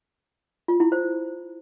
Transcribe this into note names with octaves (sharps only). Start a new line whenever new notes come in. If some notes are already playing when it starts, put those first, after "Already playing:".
F4
E4
C5